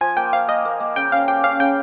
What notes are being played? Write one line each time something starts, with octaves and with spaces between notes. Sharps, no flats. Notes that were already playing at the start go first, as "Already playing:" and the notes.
F3 G#5
A#3 G5
F3 F5
A#3 D#5
A#3
A#3
C#3 G5
C#4 F5
G4 G5
C#4 F5
C#3 G5